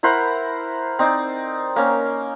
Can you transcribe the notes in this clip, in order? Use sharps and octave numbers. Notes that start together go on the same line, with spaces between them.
E4 A#4 C5 F#5
C4 D#4 D5
A#3 C#4